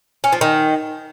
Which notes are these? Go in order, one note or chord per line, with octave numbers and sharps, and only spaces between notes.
C#4
F3
D#3